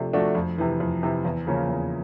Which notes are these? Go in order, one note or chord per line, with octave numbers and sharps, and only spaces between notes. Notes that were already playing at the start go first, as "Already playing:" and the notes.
Already playing: C3 F3 A3 D4
F3 A3 D4 F#4
F2
C3 E3
F2
C3 E3
E2
C#3 F3 A#3 C#4
E2